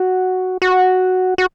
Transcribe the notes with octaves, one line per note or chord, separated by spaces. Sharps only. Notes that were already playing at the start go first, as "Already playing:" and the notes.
Already playing: F#4
F#4
F#4